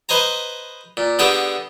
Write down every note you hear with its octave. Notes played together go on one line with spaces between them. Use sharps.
B4 C5 D#5 G#5 A#5
A#2
D3 B3 G4 G#4 G5 A5